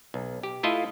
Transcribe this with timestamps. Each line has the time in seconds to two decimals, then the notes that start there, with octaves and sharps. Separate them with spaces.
0.14 B1
0.43 G4
0.63 A3 E4 F4 A4 D#5